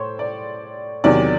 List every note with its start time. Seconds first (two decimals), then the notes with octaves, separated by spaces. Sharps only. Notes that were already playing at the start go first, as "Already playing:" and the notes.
Already playing: A2 C5 C#5
0.19 D5
1.04 E2 C3 D#3 F#3 D5